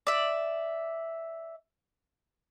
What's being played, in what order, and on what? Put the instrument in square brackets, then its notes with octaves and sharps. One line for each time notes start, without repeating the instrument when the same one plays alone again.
[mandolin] D5 E5